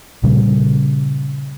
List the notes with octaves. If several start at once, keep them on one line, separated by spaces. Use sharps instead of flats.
A#2 C#3 G3 C#4